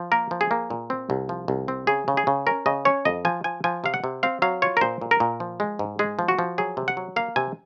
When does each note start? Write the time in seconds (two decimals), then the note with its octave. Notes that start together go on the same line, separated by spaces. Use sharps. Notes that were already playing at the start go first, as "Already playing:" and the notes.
Already playing: F3
0.12 A#3 A#4
0.31 F3
0.41 G#4
0.51 A#3
0.70 A#2
0.90 C4
1.10 C2
1.29 F3
1.48 C2
1.68 C4
1.87 C#3 G#4
2.08 C#3
2.17 G#4
2.27 C#3
2.47 C#4 A#4
2.66 C#3 D#5
2.85 C#4 C#5
3.05 F2 D#5
3.25 F3 G#5
3.44 F3 G#5
3.64 F3 G#5
3.84 C3 F5
3.94 F#5
4.04 C3
4.23 C4 F5
4.42 F#3 F5
4.62 F4 C#5
4.77 A#4
4.81 A#2 C5
5.01 A#2
5.11 A#4
5.20 A#2
5.40 F3
5.60 G#3
5.79 G#2
5.99 G#3 G#4
6.19 F3
6.28 F#4
6.39 F3
6.58 F#3 G#4
6.77 C3
6.88 F#5
6.97 F#3
7.16 A#3 F5
7.36 C3 G#5